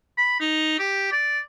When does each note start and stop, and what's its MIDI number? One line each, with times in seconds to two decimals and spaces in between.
0.18 0.39 83
0.40 0.75 63
0.79 1.12 67
1.12 1.39 74